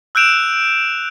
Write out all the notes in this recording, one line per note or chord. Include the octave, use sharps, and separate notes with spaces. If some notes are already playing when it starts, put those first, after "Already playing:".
E6 F#6 G6 D7 E7 F7